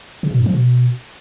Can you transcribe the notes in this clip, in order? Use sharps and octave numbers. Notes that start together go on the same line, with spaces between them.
C#3
B2
G2
F3
B2